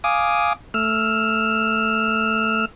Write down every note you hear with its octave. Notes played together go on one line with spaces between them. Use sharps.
F5 G#5 D6 D#6
A3 E6 F6